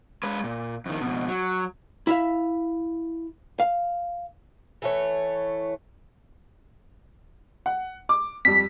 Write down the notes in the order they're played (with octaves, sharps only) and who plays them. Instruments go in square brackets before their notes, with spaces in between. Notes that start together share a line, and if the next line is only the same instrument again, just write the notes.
[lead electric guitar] G#3 B4
A#2
F2 D#3
F2 B2
F#3
[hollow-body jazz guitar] E4 E5 F5
F5
[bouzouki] E3 A3 C#5
[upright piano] F#5
D6
[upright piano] F2 G3 [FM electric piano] B6